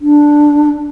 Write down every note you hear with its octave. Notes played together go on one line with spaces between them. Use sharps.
D4